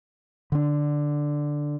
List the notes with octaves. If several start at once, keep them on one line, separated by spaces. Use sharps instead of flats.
D3 D4